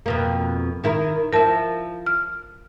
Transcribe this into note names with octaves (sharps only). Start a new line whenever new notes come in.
F2 B2 A#3
D#3 E4 A#4
F3 E4 A#4 A5
F6